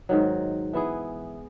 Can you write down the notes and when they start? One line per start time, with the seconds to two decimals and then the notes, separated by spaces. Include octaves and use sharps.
0.09 G#2 D#3 F#3
0.73 E3 B3 E4 G#4